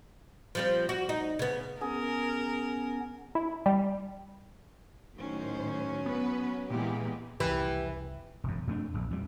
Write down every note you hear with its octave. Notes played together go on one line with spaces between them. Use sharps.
F3 G3 C4
F#4
D#4
C#3 B3
B3 C#4 G#4 A#4
E4
G3
A2 D#3 F#3 C#4 C5
B3 B4
A#2 E3 G#3 B3 G4
C2 F2 C#3 E3 G4 B4
E1 F#2
F2 A3 D4
D#1 A#1
F2 G3